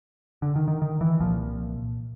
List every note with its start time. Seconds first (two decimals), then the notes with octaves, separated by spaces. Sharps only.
0.42 D3
0.56 D#3
0.68 D#3
0.82 D#3
1.01 E3
1.20 C2 A#2 F3